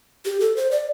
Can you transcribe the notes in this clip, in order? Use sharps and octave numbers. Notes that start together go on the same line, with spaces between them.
G4
A4
C5
D5